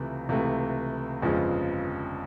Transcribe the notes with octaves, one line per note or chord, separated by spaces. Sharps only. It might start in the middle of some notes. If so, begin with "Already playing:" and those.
Already playing: C#2 C3 E3 A3
C#2 C3 E3 A3
G1 F2 C#3 F3 G#3